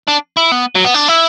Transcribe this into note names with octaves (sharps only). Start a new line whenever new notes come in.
D4
E4
B3
F#3
B3
D4
E4